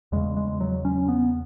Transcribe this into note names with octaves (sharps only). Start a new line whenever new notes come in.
E2 C#3 G#3
G#3
F#3
C#4
B3